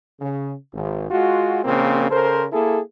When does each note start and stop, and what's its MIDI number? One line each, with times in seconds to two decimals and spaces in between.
0.21 0.53 49
0.74 1.09 32
1.11 1.60 56
1.11 1.60 65
1.11 1.60 66
1.64 2.06 34
1.64 2.06 46
1.64 2.06 49
1.64 2.06 58
1.64 2.06 60
2.10 2.44 49
2.10 2.44 69
2.10 2.44 70
2.10 2.44 72
2.52 2.79 58
2.52 2.79 64
2.52 2.79 68
2.52 2.79 69